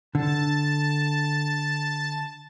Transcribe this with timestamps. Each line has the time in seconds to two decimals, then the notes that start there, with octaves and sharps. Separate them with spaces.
0.15 D3 A5